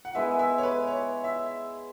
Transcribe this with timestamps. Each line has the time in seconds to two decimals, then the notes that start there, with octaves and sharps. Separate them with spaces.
0.05 F#5
0.15 G#3 B3 E4 G#4 E5
0.39 E5
0.58 C#5
0.63 B4
0.87 C#5
1.24 E5